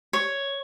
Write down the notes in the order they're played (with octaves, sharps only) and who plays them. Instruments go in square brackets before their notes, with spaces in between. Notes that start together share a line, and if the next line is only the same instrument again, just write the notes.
[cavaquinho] C#5